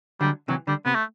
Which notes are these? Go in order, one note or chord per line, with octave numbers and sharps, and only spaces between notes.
D3 F#3 G3
C3 E3 F#3
D3 G3
C3 B3
A3